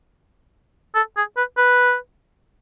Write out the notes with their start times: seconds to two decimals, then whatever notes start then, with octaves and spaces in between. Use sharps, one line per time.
0.95 A4
1.17 G#4
1.37 B4
1.58 B4